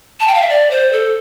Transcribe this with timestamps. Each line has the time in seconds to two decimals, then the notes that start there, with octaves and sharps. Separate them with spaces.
0.20 A5
0.27 G5
0.34 F5
0.42 E5
0.49 D5
0.71 C5
0.93 A4